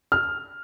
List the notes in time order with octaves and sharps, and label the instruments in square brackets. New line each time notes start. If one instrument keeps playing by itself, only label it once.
[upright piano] F6